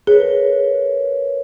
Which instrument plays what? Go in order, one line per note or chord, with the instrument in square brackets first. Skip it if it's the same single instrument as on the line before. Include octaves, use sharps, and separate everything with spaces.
[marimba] G#4 [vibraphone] A#4 B4 C#5